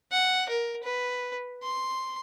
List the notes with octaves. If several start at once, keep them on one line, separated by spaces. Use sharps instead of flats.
F#5
A#4
B4
C6